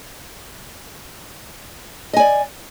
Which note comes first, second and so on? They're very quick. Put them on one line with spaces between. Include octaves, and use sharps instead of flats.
D#5 G#5 D5